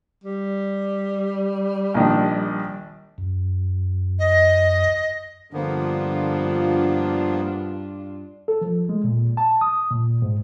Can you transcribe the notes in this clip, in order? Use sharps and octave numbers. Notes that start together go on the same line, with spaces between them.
G3
A#1 D#3 D4
F#2
D#5
G2 D3 F3 A#3 B3 D4 F4
A4
F3
G#3
A#2
A5
D#6
A#2
G#2